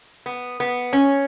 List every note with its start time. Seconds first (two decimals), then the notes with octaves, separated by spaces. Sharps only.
0.26 B3
0.60 B3
0.93 C#4